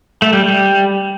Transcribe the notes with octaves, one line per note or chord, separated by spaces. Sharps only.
A3
G3
G3